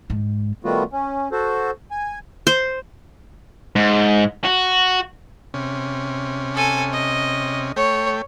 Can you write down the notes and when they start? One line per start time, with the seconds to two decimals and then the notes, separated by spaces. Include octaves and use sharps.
0.10 G#2
0.64 D#3 G3 A3 B3 F4 F#4
0.93 C#4
1.32 F#4 A4 C5
1.91 G#5
2.47 C5
3.76 G#2
4.45 F#4
5.54 C3 C#4
6.55 A4 G#5
6.93 D#5
7.76 A3 C#5 G5